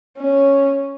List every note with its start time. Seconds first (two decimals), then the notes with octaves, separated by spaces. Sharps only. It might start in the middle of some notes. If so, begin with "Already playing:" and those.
0.18 C#4